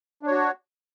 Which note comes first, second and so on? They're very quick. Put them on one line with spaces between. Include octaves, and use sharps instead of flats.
D4 C#5 F#4